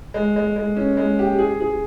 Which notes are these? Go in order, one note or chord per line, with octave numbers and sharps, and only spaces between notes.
G#3
G#3
G#3
C#4
G#3
G4
G#4
G#4